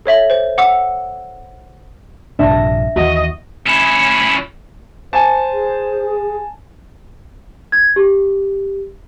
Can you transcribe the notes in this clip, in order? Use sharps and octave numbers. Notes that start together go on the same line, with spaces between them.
A4 C#5 E5 F#7
C5
F#5 D6 E6
A#1 G2 C3 D4 E5 A#6
D#2 E3 F#4 D#5
C#4 E4
C5 G#5 A5
G#4
G#6
G4